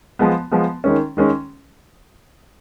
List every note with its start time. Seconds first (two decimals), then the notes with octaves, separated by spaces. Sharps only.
0.19 F3 G#3 B3
0.51 F3 G#3 B3
0.84 D#3 G#3 C#4
1.17 D#3 G#3 C#4